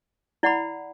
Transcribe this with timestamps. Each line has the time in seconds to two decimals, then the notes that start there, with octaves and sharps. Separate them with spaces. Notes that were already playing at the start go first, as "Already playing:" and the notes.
0.43 E4 D5 F#5 B5